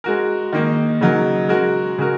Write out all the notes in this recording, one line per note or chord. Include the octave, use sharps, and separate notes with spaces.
G#3 F#4 A#4
D#3 A#3 D#4
C#3 F#3 D#4 A#4
G#3 F#4 A#4
C#3 G#3 F#4 A#4